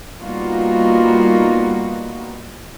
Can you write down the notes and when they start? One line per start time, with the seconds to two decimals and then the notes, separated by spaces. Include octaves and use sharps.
0.21 G3 A#3 B3 D#4 F4 F#4